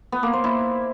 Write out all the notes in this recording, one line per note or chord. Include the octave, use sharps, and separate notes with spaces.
B3
A#3
C5
E4